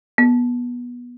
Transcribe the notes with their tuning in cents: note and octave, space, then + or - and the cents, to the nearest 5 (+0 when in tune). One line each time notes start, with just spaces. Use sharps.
B3 -20